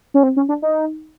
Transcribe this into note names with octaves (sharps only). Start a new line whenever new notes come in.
C#4
C4
C#4
D4
D#4